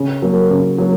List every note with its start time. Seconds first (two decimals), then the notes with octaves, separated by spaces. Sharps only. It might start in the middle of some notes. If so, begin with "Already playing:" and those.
Already playing: C#3
0.22 F#3 A#3
0.50 C#3
0.78 F#3 A#3